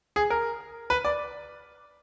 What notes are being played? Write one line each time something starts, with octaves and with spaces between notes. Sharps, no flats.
G#4
A#4
B4
D5